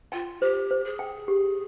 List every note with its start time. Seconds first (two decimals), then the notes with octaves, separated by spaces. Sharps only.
0.12 F4 G5
0.41 G4 C5
0.71 C5
0.85 G#4
0.99 G5
1.28 G4